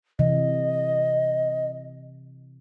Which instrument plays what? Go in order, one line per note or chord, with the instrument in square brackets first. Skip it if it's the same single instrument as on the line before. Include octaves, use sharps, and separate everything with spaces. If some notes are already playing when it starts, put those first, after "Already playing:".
[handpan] C3 E3 [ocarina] D#5